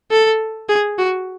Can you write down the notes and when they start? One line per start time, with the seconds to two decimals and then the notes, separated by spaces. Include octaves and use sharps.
0.11 A4
0.69 G#4
0.98 F#4